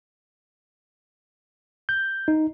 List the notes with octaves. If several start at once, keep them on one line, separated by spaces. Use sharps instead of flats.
G6
D#4